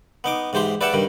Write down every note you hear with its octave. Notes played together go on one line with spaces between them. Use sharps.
B3 D#4 D6
G#2 E3 G4 C5 C6
B4 D5 E5 F#5 G5 A5
G2 D#3 G3